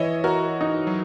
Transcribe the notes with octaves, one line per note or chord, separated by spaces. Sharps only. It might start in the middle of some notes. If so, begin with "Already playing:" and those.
Already playing: E3 C#5 D#5 E5
F#4 A#4
D#4
F#3